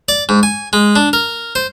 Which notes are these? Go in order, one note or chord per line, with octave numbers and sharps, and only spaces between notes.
D5
G#2
G#5
G#3
D4
A#4
C5